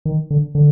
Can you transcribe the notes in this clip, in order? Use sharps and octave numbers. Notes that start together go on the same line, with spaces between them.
D#3
D3
D3